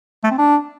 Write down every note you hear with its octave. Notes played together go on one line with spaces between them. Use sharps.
A3
C4
D4